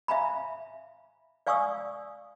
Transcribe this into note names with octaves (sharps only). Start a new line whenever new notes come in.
E5 F5 G#5 A#5 B5
D5 F5 G#5 C#6 D#6 E6